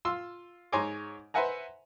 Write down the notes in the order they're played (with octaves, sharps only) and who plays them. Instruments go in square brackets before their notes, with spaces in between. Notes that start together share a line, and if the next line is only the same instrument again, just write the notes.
[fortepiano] F4 C6 E6
G#2 C#5 G#5 A#5 C6 D6
B4 C5 E5 F#5 G#5 A#5